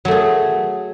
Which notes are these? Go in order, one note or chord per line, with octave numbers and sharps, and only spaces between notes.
F#3 A3 G#4